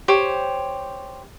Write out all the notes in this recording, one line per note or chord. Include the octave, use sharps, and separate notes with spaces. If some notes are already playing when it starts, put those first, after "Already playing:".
G4 C5 C#5